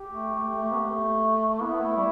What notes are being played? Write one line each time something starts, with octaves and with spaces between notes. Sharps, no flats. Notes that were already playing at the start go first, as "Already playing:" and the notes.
Already playing: G4
A3
A3
A3
B3
A3
B3 E4
A3
G3